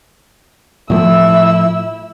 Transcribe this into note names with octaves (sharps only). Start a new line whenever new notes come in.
A2 F3 A3 E4 E6